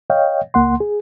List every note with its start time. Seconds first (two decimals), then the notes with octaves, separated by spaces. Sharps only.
0.10 C#5 D#5 F5 G5
0.54 C#2 A#3 F#5 C6
0.80 G#4